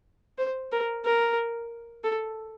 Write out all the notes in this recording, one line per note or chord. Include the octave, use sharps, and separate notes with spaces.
C5
A#4
A#4
A4